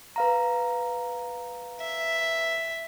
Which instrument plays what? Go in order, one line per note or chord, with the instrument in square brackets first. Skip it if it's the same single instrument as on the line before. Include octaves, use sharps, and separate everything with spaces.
[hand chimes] B4 F5 A#5
[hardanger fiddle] E5